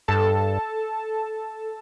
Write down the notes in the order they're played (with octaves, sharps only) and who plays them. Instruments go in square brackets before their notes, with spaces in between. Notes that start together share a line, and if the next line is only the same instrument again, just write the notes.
[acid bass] G2 [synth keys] A4 A5